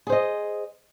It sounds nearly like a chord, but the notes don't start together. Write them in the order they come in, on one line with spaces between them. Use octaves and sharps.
G#4 C5 D#5